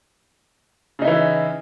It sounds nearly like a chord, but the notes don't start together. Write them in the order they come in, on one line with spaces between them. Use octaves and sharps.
C#3 D#4 E4 E3